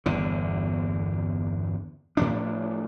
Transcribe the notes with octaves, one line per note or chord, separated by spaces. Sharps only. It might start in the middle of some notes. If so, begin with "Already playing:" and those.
G1 E2 D3
A2 F3 D4